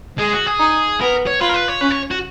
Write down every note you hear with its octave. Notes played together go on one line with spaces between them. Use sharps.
G#3 G#4
F#4
G#4
D#4
B3 A#4
C#5
F4 B4
A#4
B4
C#5
C#4 B4
C#5
F#4